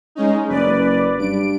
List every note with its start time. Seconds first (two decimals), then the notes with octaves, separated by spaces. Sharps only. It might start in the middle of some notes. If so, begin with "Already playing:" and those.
0.15 G#3 C#4 D#4
0.49 F#1 B4 D5
1.19 G2 D7